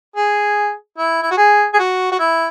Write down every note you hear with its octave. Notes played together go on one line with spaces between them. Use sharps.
G#4
E4
E4
F#4
G#4
G#4
F#4
F#4
E4